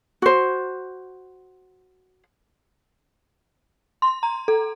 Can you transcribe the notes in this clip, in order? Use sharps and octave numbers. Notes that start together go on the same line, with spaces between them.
F#4 C5
C6
A#5
A4